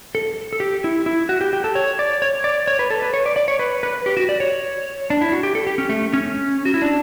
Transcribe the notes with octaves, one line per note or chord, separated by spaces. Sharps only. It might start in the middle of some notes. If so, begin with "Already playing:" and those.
A4
A4
G4
E4
E4
F#4
G4
G4
A4
C#5
D5
C#5
D5
C#5
B4
A4
B4
C#5
D5
D5
C#5
B4
B4
G4
F#4
D5
C#5
D4
E4
F#4
G4
A4
G4
C#4
A3
C#4
F#4
E4
D4